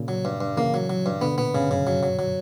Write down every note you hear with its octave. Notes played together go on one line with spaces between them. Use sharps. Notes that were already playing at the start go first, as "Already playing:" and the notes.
Already playing: A#2 C#3
F#3
G2
G2
C#3 E3 A#3
F#3
F#3
G2
B2 D3 B3
A#2 B3
G2 C#3
F#2 C#3
F#3
F#3
F#3